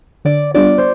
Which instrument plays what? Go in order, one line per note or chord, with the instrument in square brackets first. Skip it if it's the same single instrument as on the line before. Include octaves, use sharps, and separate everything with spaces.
[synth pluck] D3 [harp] D5
[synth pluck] G3 B3 D4 F4 [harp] D5
[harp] C5